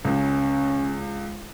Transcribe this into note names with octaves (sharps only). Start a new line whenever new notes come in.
C#2 C#4